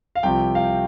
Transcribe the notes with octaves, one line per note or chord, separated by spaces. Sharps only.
F5
C2 C3 F3 G5
F5